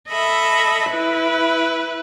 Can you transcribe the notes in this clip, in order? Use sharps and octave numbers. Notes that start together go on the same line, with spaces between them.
A4 D#5 E5 B5
E4 B4